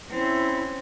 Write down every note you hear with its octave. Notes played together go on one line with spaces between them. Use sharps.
C4 C#4 E4